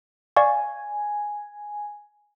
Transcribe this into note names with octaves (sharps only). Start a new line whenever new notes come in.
D5 F5 G#5 C#6